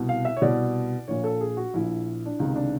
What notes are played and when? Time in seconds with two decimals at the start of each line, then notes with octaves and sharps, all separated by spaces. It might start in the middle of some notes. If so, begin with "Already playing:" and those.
Already playing: C2 B2
0.09 F5
0.25 E5
0.37 C#5
0.41 C2 B2 D5
1.08 A#1 A#2 C#5
1.24 A4
1.41 G#4
1.57 F#4
1.74 A#1 A#2 E4
2.25 D4
2.39 C#2 C3 D#3 D#4
2.56 D4